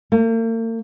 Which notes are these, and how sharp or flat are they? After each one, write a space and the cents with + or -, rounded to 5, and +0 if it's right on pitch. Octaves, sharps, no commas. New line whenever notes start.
A#3 -45